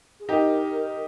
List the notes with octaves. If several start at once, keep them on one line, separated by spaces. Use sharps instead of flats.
G#4
D#4 G4 A#4